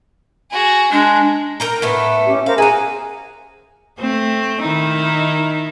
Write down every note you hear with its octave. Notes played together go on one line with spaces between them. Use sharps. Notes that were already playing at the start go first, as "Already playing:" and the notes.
F#4 G#4
G#3 D4
A#4 G5 A#5
A2 A3 B3 B4
C#4 G4
A#4 C5 F5
E4 F#4 G#4 G#5 A#5
A3 C4
D#3 D#4 E4